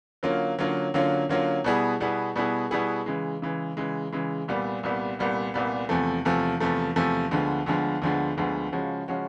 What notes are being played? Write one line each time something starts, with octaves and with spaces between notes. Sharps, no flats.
D3 F#3 A#3 C#4 F4
D3 F#3 A#3 C#4 F4
D3 F#3 A#3 C#4 F4
D3 F#3 A#3 C#4 F4
B2 G3 B3 E4 G#4
B2 G3 B3 E4 G#4
B2 G3 B3 E4 G#4
B2 G3 B3 E4 G#4
C#3 E3 G#3
C#3 E3 G#3
C#3 E3 G#3
C#3 E3 G#3
C2 A#2 G3 B3
C2 A#2 G3 B3
C2 A#2 G3 B3
C2 A#2 G3 B3
E2 C3 F3 A3
E2 C3 F3 A3
E2 C3 F3 A3
E2 C3 F3 A3
D2 D3 F3 G#3 B3
D2 D3 F3 G#3 B3
D2 D3 F3 G#3 B3
D2 D3 F3 G#3 B3
C#3 F3 G#3 C#4 F#4
C#3 F3 G#3 C#4 F#4